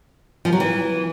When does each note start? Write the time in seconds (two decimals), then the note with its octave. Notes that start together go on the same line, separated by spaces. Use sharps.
0.45 F3
0.53 F#3
0.60 E3